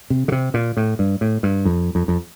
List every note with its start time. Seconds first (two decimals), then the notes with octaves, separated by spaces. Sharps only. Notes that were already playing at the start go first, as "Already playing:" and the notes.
0.10 C3
0.28 D3
0.32 C3
0.54 A#2
0.77 A2
0.99 G2
1.21 A2
1.43 G2
1.65 F2
1.95 F2
2.08 F2